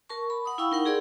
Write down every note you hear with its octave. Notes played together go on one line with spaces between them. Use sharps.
A#4 A5 C#6
B5
F#5 D#6
E4 F5 G5 B5 C#6 E6
D#4 A#4 F#5
G4 G#4 A#4 D5 C6